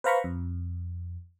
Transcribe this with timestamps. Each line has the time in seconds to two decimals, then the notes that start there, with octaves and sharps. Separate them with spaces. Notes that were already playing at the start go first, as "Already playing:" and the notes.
0.04 B4 C5 F5 A#5 B5 C#6
0.24 F2